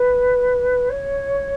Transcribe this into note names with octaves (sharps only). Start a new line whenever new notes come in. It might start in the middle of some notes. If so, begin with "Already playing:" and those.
Already playing: B4
C#5